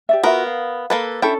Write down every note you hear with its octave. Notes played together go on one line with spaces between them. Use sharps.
G4 D5 E5
B3 F4 F#4 A#4 E5
F5
A#3 A4 B4
C#4 D4 E4 A4 G5